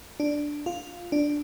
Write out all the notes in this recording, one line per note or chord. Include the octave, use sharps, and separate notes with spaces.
D4
F4
D4